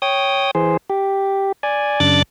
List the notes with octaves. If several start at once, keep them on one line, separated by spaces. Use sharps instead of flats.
C#5 G5 D#6
E3 G#4 C5
G4
D5 G#5
F#2 C#3 D4 D6 F#6 A6